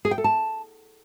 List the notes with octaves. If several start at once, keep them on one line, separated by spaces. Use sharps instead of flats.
G#4
G5
A4
A5